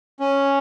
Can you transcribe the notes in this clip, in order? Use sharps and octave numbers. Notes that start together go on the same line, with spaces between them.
C#4